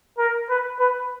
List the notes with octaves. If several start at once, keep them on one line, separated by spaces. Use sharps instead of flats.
A#4
B4
B4